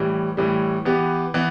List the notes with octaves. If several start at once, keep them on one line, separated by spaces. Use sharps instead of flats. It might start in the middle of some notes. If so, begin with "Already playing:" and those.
Already playing: A2 E3 G3
A2 E3 G3
E3 B3 G4
E3 B3